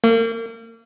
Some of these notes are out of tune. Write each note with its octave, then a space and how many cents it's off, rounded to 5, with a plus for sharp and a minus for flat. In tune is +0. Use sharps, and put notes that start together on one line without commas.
A#3 -35